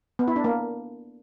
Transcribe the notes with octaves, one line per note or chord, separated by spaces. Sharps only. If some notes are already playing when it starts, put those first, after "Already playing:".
B3
E4
D4
A#3